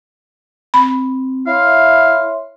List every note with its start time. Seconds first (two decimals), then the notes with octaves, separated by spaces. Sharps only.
0.74 C4 B5
1.47 E4 C#5 E5 F5 C6